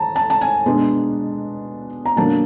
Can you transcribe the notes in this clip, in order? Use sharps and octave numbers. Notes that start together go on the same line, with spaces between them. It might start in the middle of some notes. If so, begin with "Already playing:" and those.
Already playing: G#3 A5 A#5
A5
A5
G#5
B2 G#3 B3 D4
A#5
B2 F#3 A#3 D4 A5